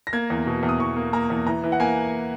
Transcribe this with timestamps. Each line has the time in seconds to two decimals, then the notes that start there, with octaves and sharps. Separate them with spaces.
0.07 A#6
0.13 A#3 G#6
0.30 E2
0.47 B2
0.63 E2
0.69 D#6
0.79 E2 C#6
0.96 A#3
1.13 A#3 A#5
1.30 E2
1.47 E3 A#5
1.64 E3
1.72 F#5
1.80 A#3 G#5